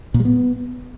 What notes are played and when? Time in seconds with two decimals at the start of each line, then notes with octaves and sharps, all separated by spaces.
0.14 A#2
0.20 G3
0.25 B3